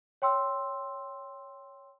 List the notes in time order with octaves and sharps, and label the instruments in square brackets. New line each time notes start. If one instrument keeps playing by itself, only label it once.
[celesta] C#5 G5 C6 E6